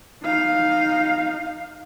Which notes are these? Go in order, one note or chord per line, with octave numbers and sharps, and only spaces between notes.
D#4 F5